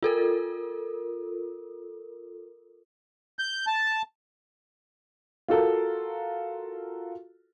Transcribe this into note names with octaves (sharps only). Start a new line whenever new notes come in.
F4 A4 A#4
G6
A5
F4 F#4 A4 A#4